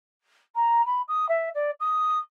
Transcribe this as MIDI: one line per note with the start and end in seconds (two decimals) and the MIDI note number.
0.55 0.84 82
0.86 1.02 83
1.08 1.28 87
1.29 1.49 76
1.54 1.71 74
1.80 2.18 87